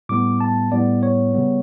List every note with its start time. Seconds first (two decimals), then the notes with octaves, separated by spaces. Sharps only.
0.09 A2 G3 B3 D6
0.41 A5
0.72 A2 G3 B3 D5
1.03 C#5
1.35 C#3 G3 B3